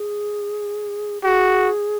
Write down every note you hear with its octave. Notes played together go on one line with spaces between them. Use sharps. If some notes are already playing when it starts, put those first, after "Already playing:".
Already playing: G#4
F#4 G#4